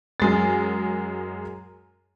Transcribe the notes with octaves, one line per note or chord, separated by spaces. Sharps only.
F#2 G#3 A6